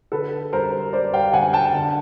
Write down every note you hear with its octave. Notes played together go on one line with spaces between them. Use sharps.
D3 A4 B4
G3 A#4 C5
G3 C5 D5
F5 G5
D3 F#5 G#5
G5 A5
D3